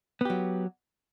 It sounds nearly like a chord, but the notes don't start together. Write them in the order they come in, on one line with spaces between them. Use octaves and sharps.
B3 G4 F#3